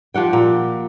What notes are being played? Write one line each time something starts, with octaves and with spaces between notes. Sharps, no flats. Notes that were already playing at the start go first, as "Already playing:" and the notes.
F3 G4 F#5 G5
A#2